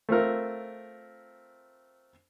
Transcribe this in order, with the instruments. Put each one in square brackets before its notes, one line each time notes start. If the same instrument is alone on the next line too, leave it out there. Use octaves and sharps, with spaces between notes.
[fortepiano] A3 C4 F4 A#4